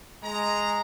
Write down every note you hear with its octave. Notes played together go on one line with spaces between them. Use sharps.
G#3 A#5